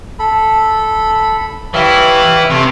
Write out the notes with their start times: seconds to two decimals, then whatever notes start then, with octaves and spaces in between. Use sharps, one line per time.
0.19 A4 B5
1.74 E3 G3 E4 C#5 F5
2.50 C3 A3